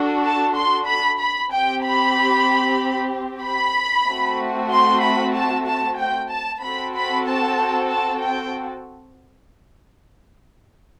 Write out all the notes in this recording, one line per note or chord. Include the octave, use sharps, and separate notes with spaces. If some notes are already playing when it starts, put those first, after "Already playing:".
Already playing: D4 F#4 A4
A5
C6
B5
B5
C4 G4 G5
B5
B5
A3 C4 F#4
C6
B5
A5
A5
G5
A5
C4 F#4 A4 B5
B5
A5
A5
G5